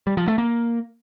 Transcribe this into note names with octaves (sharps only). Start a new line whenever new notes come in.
G3
F3
A3
A#3